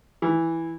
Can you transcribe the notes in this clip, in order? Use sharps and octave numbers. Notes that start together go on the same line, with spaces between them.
E3